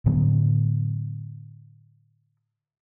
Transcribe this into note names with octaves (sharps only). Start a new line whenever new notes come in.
A2 D3 F#3 B3